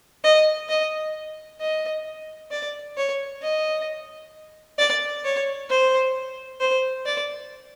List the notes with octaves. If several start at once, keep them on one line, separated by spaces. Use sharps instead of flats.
D#5
D#5
D#5
D5
C#5
D#5
D5
C#5
C5
C5
D5